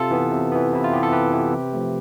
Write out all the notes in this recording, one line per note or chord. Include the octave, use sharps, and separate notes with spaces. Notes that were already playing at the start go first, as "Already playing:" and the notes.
Already playing: C3 F4 A4
E3 B3
C3
E3 B3
C3 E4
F4
E3 B3 G4
A4
C3 G4 B4
E3 B3
C3
F3 A3